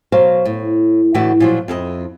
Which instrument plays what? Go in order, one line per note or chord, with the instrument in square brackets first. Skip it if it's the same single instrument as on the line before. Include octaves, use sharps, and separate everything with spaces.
[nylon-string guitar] B2 F#3 C5 F5
A2
A2 D3 E3 F#4 D5 E5
A#2 F3 F#3
F2 E4 G4 D#5